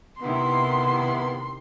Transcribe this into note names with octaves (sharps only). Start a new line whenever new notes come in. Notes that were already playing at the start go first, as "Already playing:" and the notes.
C3 D#3 B3 E4 C6